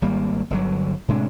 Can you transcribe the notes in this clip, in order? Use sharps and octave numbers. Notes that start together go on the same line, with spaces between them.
G#1 G3 A#3
G1 D3 F#3
A2 C3 G#3 D4